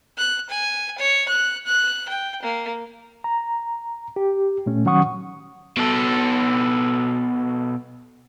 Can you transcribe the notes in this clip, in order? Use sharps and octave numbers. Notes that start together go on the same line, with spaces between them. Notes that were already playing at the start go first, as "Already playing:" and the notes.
F#6
G#5
C#5
F#6
F#6
G5
A#3
A#5
G4
A#2 A3 C#4
D#3 F#3 C#4 F#5 C#6 D#6
B2 A4